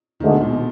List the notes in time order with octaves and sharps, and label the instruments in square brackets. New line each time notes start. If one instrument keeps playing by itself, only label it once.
[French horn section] D2 D3 G#3 [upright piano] D#3
[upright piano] B2
A#2
B2